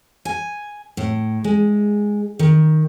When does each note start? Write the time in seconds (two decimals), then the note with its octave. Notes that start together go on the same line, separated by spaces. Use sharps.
0.25 G#5
0.97 A2
1.44 G#3
2.39 D#3